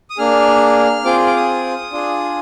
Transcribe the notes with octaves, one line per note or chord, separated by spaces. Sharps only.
D#6
A#3 D4 G#4 F6
C4 F4 G#4 D6
D6
D#6
D4 F4 G#4